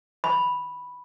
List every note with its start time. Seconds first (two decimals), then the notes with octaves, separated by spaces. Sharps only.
0.24 B5